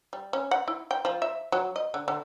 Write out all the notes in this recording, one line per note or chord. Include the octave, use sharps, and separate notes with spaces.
G3
C#4
F#5
E4
G5
F3
E5
F#3
D#5
D3
D3